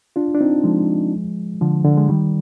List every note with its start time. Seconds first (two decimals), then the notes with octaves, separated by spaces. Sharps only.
0.16 D4 F4
0.35 D4
0.41 C4 D#4
0.64 F3 G#3
1.61 D3 F3
1.84 D3
1.97 G#3
2.09 D#3 G3